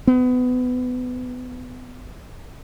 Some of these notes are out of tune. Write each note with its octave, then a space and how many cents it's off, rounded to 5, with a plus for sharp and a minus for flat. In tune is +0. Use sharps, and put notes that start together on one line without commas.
B3 +25